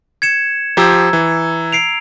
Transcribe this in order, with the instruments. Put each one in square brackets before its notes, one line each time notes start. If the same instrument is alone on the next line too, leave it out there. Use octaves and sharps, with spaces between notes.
[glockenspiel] G#6 C#7 E7
[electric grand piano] F3 G4 C5 [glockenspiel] A#5 E6 G#6
[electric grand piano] E3
[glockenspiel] C7 D7 F7